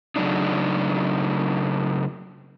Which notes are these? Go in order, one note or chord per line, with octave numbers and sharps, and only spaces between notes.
C#3 F#3 A3 D4 D#4